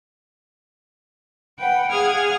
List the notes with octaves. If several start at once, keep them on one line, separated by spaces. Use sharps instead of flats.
B4 F#5 G5
G#4 F5 F#5 D#6 F6 G#6